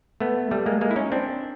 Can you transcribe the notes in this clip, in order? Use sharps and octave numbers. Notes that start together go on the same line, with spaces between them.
A3 B3
G3 A3
G#3 A#3
G#3 A#3
E4
C#4 D#4
C4 D4